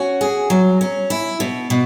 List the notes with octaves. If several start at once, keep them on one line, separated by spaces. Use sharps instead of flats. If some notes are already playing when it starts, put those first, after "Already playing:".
Already playing: C#4 F#4
G#4
F#3
C#4
E4
B2
B2